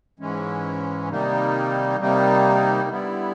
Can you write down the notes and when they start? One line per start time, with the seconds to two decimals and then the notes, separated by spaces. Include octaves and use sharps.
0.19 G#2 E3 G#3 C#4
1.09 C3 D#3 G3 A#3 D#4
1.98 C3 D#3 G3 A#3 D#4
2.88 D3 G3 B3 E4